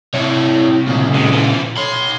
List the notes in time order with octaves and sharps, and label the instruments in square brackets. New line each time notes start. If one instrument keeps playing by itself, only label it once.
[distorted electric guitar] C2 [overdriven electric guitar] E4 C#5
[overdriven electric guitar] A#2 C#3
[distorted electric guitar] C3 G#3
E3 F3
[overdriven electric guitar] C#5 B5 [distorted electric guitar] C6